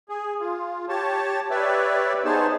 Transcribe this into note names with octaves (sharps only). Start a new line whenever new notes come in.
G#4
F4
G4 C#5 A5
G4 B4 C#5 D5 E5
B3 D#4 G#4 C5 C#5 A5